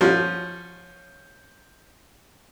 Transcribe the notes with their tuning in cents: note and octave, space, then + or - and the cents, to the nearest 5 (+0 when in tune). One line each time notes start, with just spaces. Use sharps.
F3 +0 C#4 -15 F#4 -20